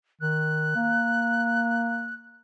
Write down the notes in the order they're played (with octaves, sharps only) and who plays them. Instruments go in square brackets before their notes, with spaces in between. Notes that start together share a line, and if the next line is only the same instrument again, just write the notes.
[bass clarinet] D#3 [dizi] F#6
[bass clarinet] A#3